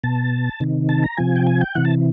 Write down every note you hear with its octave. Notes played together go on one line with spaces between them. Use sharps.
B2 A5
C3 D#3
A5
A#5
C3 F3 G#5
G5
G#5
G5
C3 E3 F#5
A5